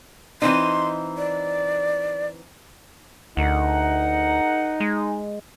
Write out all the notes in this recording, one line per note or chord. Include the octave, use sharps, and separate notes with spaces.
E3 C4 D#4 C6
D5
D2 D#4 G#4 A#4 F#5
G#3